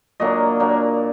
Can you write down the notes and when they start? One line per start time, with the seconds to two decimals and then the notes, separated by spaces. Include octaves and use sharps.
0.20 A#2 F#3 A#3 D4 D#5
0.60 A#2 F#3 A#3 D4